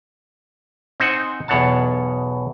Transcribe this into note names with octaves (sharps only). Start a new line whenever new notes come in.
C4 D#4 C5 F#5 G#5
B1 E2 B2 C#5 F#5 A5